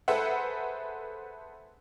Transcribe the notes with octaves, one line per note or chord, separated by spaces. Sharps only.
G#4 A4 B4 C5 E5 F#5